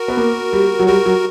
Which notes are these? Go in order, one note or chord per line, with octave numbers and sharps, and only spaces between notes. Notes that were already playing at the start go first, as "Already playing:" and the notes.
Already playing: F#4 A#4
B3
A#3
G3
F#3
G3 F#4 A#4
F#3